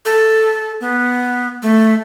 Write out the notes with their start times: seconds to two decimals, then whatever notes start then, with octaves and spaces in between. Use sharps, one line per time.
0.05 A4
0.81 B3
1.62 A3